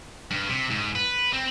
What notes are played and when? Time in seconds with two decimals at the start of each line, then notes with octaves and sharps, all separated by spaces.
0.31 G2
0.49 C3
0.70 G#2
0.95 B4
1.33 C4